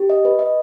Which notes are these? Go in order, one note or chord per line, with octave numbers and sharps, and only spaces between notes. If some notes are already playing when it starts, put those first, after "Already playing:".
Already playing: G4
D#5
B4
D#5